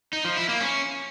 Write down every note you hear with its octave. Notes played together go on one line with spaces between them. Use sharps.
D#4
F3
E4
A#3
C#4